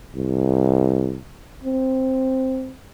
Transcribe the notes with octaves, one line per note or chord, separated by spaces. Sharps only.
C2
C4